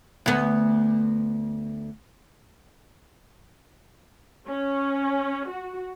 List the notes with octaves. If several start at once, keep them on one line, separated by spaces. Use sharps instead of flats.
D2 B3
C#4
F#4